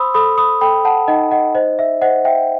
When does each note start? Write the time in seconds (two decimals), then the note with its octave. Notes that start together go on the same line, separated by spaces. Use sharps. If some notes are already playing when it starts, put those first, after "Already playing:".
Already playing: C5 B5 C6 D#6 E6
0.14 A4 B5 D#6
0.38 B5 D#6
0.61 A4 G5 B5
0.85 F#5 A5
1.08 D#4 D#5 F#5
1.31 D#5 F#5
1.55 C5 D#5
1.79 E5
2.02 C5 D#5 F#5
2.25 E5 G5